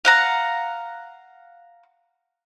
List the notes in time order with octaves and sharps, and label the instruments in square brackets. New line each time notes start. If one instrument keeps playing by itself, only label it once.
[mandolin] F5 F#5 A#5